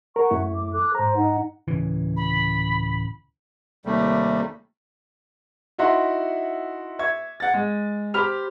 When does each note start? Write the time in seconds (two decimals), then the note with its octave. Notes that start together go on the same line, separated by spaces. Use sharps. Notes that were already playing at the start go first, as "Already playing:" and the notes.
0.16 A#4 F#5 C#6
0.31 F#2 A3 E4
0.54 D6
0.72 A4 D6 F#6
0.95 G#2 C5 A#5
1.16 D#4 D#5 F#5
1.68 D1 C#3 E3
2.17 B5
3.85 D#2 C3 G3 A3
5.78 D#4 E4 F#4 E5 F#5 C6
6.99 E5 C#6 G#6
7.40 F#5 A6
7.54 G#3
8.14 G4 C5 B5 F6 F7